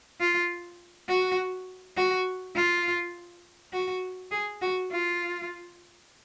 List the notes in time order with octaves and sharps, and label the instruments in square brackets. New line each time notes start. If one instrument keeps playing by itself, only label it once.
[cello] F4
F#4
F#4
F4
F#4
G#4
F#4
F4